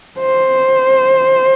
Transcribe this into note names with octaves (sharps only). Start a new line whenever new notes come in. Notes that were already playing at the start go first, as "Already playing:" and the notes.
C5